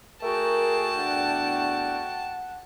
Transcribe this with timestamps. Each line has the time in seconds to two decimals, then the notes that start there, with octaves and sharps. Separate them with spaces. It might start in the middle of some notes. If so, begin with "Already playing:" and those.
0.23 A3 F#4 G#4 A#4 G5 A5
0.98 E2 D4 F#5